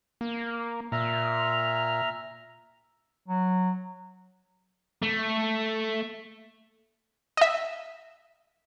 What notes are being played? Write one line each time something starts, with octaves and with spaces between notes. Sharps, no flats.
A#3
A#2 E5 A#5 F6
F#3
A3
D#5 E5